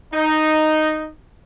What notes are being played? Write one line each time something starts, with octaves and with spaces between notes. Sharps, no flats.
D#4